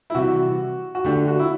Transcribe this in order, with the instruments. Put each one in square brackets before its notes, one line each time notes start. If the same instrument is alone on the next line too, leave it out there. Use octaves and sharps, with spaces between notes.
[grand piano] E4
[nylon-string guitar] C3 E3 G3 [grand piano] F#4
[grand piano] F#4
[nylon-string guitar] D3 A3 D4 [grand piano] G4
[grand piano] F#4
E4